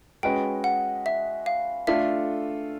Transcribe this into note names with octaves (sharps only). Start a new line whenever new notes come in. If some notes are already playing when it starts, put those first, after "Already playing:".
G#3 C#4 F#4 B4 D#5 G5
F#5
E5
F5
A3 D4 F4 A4 E5